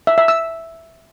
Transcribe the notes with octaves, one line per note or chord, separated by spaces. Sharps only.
E5
E5
E6